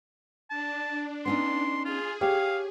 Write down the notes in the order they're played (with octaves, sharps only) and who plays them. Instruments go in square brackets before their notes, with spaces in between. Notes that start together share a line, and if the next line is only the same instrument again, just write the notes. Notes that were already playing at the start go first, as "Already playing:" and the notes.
[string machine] D4 [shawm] A5
[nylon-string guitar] B3 C#4 D#4 [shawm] C6
[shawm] F4 [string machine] G#4
[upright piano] G4 [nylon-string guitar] C#5 [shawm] F5